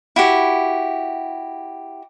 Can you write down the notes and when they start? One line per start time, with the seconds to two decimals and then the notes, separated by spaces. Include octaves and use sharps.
0.16 E4 F#4 G4